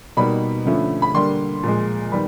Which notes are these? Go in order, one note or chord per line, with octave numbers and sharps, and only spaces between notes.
B2 G3 A#3 D#4 B5
D3 F3 A3 C#4
B5
D3 G3 A#3 C6
A#2 F3 G#3
D#3 G3 B3 B5